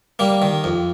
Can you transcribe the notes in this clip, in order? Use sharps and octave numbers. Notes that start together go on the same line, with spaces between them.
G3 A#3
D#3
F2